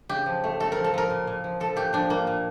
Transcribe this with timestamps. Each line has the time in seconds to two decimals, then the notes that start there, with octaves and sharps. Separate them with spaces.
0.09 C#3 G4
0.26 F3
0.44 A3
0.60 A3 A4
0.72 F3 A#4
0.84 A4
0.94 F3 A#4
1.10 A#2
1.27 A#2
1.44 F3
1.60 F3 A4
1.76 A#2 G4
1.93 F3 D4
2.10 A#2 A#3
2.27 A#2